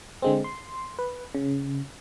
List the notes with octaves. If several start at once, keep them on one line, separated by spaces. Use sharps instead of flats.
D3 G#3 C4
C6
B4
C#3